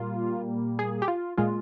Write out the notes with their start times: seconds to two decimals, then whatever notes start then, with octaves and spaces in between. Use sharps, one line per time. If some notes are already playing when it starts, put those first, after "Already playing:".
Already playing: A#2 G3 A#3 F4
0.79 G#4
1.02 G4
1.08 F4
1.38 A#2 G#3 F4